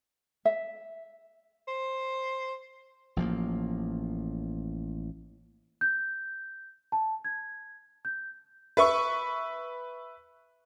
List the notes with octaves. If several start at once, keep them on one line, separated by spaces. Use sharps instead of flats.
E5
C5
A1 F3 A#3
G6
A5
G#6
G6
B4 E5 C#6